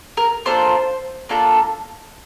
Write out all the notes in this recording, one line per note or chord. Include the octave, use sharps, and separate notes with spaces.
A#4
A#3 D4 F4 A4 C5
A#3 D4 F4 A4